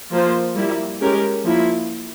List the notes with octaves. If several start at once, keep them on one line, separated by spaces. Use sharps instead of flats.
F3 A#3 F4 C5
G3 A#3 E4
G#3 C#4 G4 A#4
F3 A#3 E4